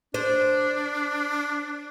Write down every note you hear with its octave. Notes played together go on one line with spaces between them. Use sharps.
D4 C5